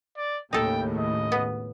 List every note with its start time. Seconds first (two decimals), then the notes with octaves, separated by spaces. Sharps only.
0.17 D5
0.53 D#2 A2 C#3 D#4 A4 G5
0.98 D#5
1.32 B3